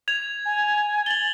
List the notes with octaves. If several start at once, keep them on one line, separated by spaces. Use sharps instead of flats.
G#6 F7
G#5
A6 F#7 G7